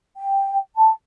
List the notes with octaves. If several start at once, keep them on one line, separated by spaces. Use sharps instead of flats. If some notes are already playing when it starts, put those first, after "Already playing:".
G5
A5